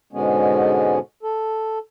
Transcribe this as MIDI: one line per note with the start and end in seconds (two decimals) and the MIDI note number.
0.13 0.99 44
0.13 0.99 47
0.13 0.99 50
0.13 0.99 56
0.13 0.99 59
0.13 0.99 61
1.23 1.79 69